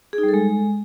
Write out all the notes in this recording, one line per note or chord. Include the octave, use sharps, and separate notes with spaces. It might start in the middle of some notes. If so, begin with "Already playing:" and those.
G#4
D#4
G3
A4
G#3